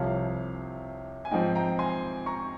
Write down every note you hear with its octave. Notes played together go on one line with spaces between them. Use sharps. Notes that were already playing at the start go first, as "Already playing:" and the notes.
Already playing: C2 C3 F3 C#5 F5
G#5
G#2 F3 C4 D#5 G5
G5 A#5
G#5 C6
A#5 C#6